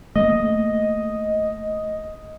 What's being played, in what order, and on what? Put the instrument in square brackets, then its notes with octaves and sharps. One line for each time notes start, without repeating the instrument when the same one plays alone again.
[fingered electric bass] A3 A#3 [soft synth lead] D#5